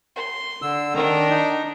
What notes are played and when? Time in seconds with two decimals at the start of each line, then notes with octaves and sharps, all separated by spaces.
0.16 C6
0.62 D3 E6
0.94 D#3 D4 A#5
1.30 D#4